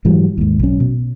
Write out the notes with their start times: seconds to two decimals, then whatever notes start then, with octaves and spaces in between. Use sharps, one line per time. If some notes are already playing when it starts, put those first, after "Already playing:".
0.05 G#2 E3 F#3 G3
0.38 D#2 G#2
0.59 B1 C#4
0.80 B2